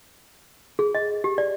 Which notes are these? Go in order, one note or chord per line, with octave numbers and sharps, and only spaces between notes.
G#4
D#5
G4
D5